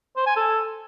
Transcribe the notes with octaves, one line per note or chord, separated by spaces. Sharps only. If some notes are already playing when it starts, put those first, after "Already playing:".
C5
G#5
A4